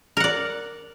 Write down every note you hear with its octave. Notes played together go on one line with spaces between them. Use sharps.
A#4 D5 F#5